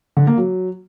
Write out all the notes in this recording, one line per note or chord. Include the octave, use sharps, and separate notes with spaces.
D3
A#3
F#3